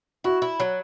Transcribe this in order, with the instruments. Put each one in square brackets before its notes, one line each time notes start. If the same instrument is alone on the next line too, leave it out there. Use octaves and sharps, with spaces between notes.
[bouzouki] E4 [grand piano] F#4
[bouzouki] E4
F#3